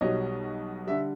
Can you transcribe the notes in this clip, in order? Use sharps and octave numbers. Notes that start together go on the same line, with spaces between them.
B1 B2 G3 C#5 D#5
D3 G3 E5